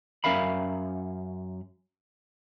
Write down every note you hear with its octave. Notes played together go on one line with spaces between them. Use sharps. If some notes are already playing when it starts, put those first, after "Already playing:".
F#2 C#4 A#4 E5 F5 B5